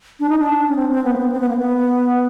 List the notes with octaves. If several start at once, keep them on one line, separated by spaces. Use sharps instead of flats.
D4
D#4
D4
C#4
C4
C4
B3
A#3
B3
C4
B3
A#3
B3